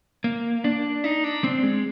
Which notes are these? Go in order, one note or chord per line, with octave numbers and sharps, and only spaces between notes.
A#3
D4
D#4
D4
C4
G#3